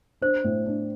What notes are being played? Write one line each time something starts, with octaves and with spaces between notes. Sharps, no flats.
D4 C5
A2
D4